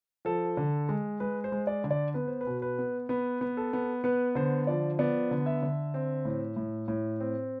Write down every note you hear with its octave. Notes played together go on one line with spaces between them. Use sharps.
F3 A4
D3
G#3
G#3 B4
C5
G#3
D5
D3
D5
B3 B4
C5
B4
B2
B4
B3
B3 B4
B3
A4
B3
B3 B4
D3 C5
F3 D5
B3 D5
D3
E5
D3
C4
A2
A2
A2
C4